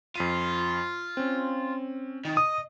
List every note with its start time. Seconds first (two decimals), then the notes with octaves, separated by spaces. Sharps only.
0.16 F2 F4 B6 D#7
1.17 C4 C#4
2.25 D#3
2.37 D#5 D#6